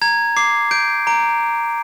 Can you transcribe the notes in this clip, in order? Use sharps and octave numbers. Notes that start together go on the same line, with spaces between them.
A#5 G#6
D6 C7
G6 D7
A#5 D7